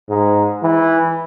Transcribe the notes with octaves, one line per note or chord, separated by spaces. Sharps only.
G#2
E3